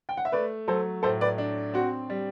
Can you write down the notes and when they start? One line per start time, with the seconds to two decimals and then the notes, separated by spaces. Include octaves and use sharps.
0.09 G5
0.17 F#5
0.25 E5
0.32 A3 B4 D5
0.68 F#3 A4 C5
1.03 A2 A4 C5
1.21 B4 D5
1.38 D4
1.74 C4 F#4
2.10 G3